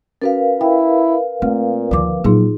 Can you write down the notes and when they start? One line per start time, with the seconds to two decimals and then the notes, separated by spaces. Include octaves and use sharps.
0.22 C#4 F#4 A#4 B4 F5
0.61 E4 G5
1.42 A#2 A3 C4
1.91 D2 D#3 F3 D6
2.24 A#2 F#3 D#4 F4 G#4